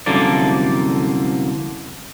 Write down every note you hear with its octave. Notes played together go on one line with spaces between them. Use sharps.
C2 F#2 D3 F3 A#3 D5